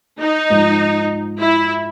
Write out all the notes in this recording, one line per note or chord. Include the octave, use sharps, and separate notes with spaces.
D#4
G#2 F3 G#3
E4